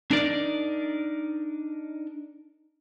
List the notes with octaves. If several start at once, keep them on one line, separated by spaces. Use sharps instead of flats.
D4 D#4 A#4 D5